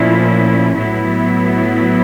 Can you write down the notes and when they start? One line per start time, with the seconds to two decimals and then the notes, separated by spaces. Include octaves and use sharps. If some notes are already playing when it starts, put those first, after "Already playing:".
Already playing: A#2 F3 A3 C#4 E4
0.74 A2 F#3 B3 E4